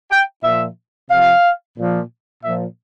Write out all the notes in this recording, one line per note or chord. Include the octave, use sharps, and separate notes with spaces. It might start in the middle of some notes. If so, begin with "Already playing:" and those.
G5
A#2 F3 E5
C3 F3 F5
A#2 F3
A#2 F3 E5